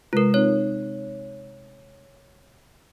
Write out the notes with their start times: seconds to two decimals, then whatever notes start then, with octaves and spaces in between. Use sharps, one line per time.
0.13 C3 G#3 F4 A#4 B4
0.34 C4 D#4 C#5